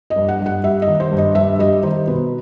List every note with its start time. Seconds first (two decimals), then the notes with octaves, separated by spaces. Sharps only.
0.10 D#5
0.16 G2
0.28 F#5
0.41 G2
0.46 F#5
0.64 G3 E5
0.82 D#5
0.87 D#3
1.00 C5
1.11 G2
1.18 D#5
1.35 G2 E5
1.59 G3 D#5
1.83 D#3 C5
2.07 B2 B4